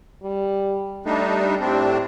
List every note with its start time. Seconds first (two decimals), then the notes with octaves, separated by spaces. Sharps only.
0.22 G3
1.06 G3 A3 D4 D#4
1.60 A2 C4 D4 G4